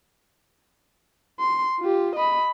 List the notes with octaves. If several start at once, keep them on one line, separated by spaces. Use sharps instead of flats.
C6
F4 G4
D#5 B5